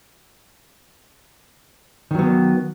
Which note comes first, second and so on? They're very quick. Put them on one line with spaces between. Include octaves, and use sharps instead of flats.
D#3 F#3 B3